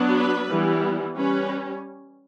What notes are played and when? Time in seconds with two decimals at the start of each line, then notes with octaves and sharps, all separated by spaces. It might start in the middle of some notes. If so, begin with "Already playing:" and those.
Already playing: F#3 B3 D4
0.16 B4
0.49 E3 G3 B3
1.16 G3 C#4 B4